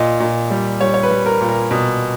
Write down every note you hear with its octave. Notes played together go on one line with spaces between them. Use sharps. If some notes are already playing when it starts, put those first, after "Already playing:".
Already playing: A#2 D#5
A#2
G3
G3 C#5
C#5
B4
G3
A#4
A#2
A#4
B2